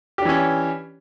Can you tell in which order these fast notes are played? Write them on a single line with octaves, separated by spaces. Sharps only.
G4 D4 E3 C#4